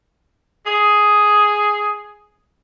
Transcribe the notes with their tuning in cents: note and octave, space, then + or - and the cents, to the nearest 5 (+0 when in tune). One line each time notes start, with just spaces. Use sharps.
G#4 +5